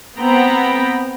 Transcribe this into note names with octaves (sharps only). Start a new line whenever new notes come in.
B3 C4 G5 A#5 B5